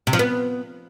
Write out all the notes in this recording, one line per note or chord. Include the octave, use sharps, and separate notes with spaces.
C3
F3
B3